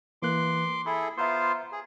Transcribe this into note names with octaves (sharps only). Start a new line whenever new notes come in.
E3 A#3 C6 D6 F#6
E4 G#4 A4 B5
B3 F4 C5 E5 A#5 C6
G#4